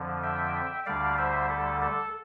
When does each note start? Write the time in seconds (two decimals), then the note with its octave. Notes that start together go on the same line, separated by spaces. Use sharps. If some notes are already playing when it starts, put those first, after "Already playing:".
Already playing: F2 D3 F3
0.23 E5 G5
0.86 D2 D3 G3 D5 F5
1.18 C5 E5
1.50 A4
1.81 A4